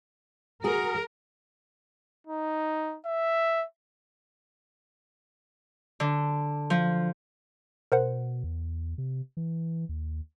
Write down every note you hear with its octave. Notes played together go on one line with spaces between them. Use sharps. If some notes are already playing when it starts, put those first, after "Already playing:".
F#4 G#4 A#4
D#4
E5
D3
F3
B2 A#4 C5 F#5
E2
C3
E3
D#2